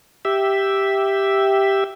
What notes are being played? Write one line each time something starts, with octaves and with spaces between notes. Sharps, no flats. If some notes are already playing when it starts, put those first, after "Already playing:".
G4 E5